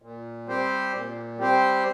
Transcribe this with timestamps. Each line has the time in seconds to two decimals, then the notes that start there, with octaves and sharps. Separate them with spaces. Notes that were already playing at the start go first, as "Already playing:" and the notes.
0.02 A#2
0.47 G3 C4 G4 C5
0.94 A#2
1.38 G3 C4 G4 C5